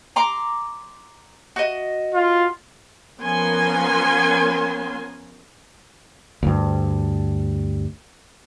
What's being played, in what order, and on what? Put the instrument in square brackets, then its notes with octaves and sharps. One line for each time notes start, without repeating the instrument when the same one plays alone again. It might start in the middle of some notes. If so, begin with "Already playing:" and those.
[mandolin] A#5 C6 D6
F#4 D#5
[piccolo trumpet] F4
[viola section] F3 B3 C#4 A#4 G#5 C6
[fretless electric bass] D2 G2